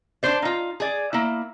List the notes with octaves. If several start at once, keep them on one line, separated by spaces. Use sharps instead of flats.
D4 C5 D5
D#4 F4
G#4 D5
A#3 E4